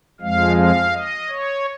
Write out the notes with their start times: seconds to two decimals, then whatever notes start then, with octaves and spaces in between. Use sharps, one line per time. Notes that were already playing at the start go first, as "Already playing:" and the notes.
0.21 F2 F3 G#3 F5
0.57 F5
0.93 D#5
1.29 C#5